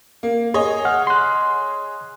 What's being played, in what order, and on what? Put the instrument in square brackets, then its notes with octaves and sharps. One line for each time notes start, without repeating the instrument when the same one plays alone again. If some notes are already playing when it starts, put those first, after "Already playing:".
[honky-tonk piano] A#3
G#4 C#5 D#5
[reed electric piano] F#5 F6
C6 F#6